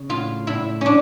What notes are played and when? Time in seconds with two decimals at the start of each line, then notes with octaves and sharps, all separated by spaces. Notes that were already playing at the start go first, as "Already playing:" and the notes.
Already playing: C#3
0.09 A2 F4
0.47 A2 E4
0.81 A2 C#4 D4